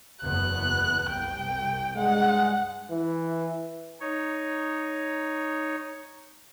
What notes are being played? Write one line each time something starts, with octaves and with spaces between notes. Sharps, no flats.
F#1 E2 B3 F#6
C2 G5
G2 G#3 F#5
E3
D#4 C#5